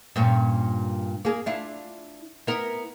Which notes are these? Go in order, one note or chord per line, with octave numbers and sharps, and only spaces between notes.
G2 A#2 C#4
A#3 G#4
D4 E4 F4
B3 E4 A#4